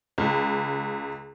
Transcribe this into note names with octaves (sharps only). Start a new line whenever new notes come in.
C#2